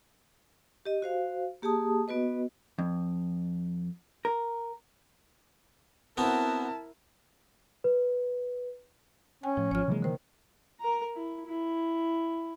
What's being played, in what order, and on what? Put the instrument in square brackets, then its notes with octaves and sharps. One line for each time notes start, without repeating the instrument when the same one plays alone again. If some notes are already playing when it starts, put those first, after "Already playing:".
[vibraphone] G4 D#5
F#4 C5 F5
A#3 G4 G#4 A5 D#6
B3 F#4 B4 D#5
[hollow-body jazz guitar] F2
A#4
[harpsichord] B3 C4 F#4 [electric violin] E4 A#4 [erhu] A5
[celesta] B4
[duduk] C#4 [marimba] G5 G#5
[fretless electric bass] A2 [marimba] F3
[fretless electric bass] G#1 F3 [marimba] C#5 F6
[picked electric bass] C3 E3 A#3 [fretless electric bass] F#3 G#3
[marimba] D3 C5 [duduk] D#3
[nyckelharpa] A#4 A#5
E4
E4